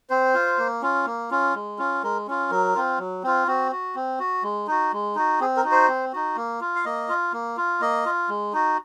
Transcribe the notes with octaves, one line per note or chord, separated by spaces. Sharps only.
C4 C5
F4
A#3
C#4 F4
A#3
C#4 F4
G#3
C#4 F4
G#3 A#4
C#4 F4
F#3 A#4
C4 F4
F#3
C4 F4
C4 F#4
F#4
C4
F#4
G#3
D#4 F#4
G#3
D#4 F#4
C4 G#4
A#4
D#4 F#4
C5
C4
D#4 F#4
A#3
F4
F5
A#3 D#5
F4
A#3
F4
A#3 D#5
F4
G#3
D#4 F#4